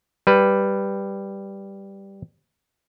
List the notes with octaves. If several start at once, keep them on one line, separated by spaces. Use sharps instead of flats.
G3 B4